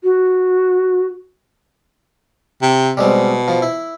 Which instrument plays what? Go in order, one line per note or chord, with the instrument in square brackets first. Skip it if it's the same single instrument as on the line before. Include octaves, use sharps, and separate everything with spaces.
[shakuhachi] F#4
[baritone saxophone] C3
[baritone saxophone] B2 [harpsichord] G3 G#3 C4
[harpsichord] F3
E4